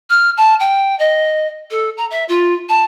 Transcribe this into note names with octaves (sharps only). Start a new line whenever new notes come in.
F6
A5
G5
D#5
A4
A#5
E5
F4
A5